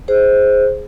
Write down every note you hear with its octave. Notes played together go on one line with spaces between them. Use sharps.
G#4 C5